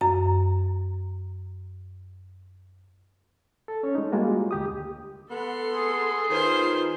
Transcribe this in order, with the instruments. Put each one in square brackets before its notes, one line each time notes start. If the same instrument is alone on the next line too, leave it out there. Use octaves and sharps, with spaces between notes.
[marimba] F#2 A#5
[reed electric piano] A4
C#4 C#5
G#3 D#4
G3 G#3 A#3 F4 F#4
D2 G4 D#6
[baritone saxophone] B3 [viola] A4 C6
[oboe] G#4
[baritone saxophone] D#3 [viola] F4 B4 [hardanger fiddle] C5 C6